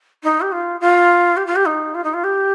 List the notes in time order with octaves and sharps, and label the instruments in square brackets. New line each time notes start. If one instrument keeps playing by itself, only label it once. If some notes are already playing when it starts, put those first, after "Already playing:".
[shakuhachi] D#4
G4
F4
F4
G4
F4
G4
D#4
F4
D#4
F4
G4